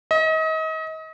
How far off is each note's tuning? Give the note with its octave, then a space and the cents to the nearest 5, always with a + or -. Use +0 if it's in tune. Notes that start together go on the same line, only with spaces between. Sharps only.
D#5 +35